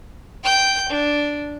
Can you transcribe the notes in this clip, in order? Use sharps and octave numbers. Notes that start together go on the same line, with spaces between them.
G5 G6
D4